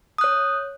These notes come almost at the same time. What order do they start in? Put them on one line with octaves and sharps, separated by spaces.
D#6 F#6 C#5